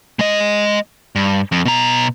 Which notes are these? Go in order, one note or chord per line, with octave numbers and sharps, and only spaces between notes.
G#3 D#5
G2
F2
B2 A#5